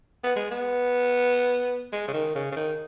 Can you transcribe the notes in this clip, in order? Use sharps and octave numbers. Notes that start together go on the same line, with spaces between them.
B3
G#3
B3
G#3
C#3
D#3
C#3
C#3
D#3